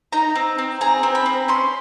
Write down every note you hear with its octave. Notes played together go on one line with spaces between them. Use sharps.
D#4 A#5
C4
C4
G#4 A#5
C4
B5
C4
C#4 C6